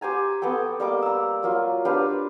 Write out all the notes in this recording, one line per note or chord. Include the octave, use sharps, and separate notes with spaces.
G4 C5 G#5 A#5
B3 C4 A4 G5
G3 A#3 D#5 D6
A#5 E6
F#3 A#3 F4
D4 G4 B4 F5